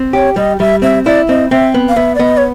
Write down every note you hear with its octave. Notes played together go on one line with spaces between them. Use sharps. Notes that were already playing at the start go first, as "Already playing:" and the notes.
Already playing: C4
G4 C#5
G3 D#5
G3 E5
C4 E5
E4 D5
C4 D#5
C4 E5
B3
F5
B3 E5
D5
B3 D#5
C#5